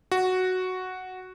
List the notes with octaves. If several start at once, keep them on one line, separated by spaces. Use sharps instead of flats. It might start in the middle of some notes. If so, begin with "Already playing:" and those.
F#4